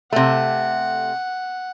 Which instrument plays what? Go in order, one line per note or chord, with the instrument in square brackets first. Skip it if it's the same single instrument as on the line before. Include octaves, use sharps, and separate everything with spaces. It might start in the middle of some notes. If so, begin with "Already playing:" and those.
[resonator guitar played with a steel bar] C3 A3 [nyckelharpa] F#5